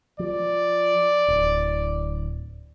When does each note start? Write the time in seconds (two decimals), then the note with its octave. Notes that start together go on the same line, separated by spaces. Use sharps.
0.19 F3 D5
1.28 D1